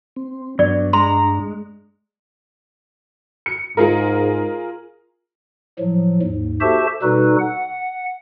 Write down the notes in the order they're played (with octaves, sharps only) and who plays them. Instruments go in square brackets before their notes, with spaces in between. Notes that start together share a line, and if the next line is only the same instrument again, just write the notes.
[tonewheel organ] C4
[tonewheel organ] G2 D4 [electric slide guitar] F#3 B3 [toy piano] D5
[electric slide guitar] G#3 [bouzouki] A#5 [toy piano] C6
[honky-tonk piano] C#7
[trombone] G#2 [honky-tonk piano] F4 G#4 A#4
[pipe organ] A2 F3 F#3
D#2 G#2
F#4 G4 A4 C5 E5 A5
B2 G3 D#4 F#4 A4 B4
F#5